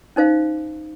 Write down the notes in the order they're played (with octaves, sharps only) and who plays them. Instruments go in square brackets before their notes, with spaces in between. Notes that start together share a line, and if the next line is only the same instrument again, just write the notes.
[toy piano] C#4 D#4 C5 F5